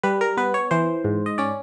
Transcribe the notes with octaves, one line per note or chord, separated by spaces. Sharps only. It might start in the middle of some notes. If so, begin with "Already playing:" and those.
G3 B4
A#4
B3 B4
C#5
E3 C5
G#2
D#5
C#4 D5